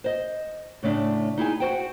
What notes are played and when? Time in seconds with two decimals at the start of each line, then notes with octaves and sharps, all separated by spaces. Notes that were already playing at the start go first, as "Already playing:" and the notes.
0.04 C5 D#5
0.83 A2 C#3 A3 D4
1.38 D#4 E4 G#4 G#5
1.60 F#4 C5 G5